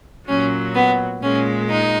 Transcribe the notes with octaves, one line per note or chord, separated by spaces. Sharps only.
A#2 F#3 C#4
B3
A#2 G#3 C#4
D#4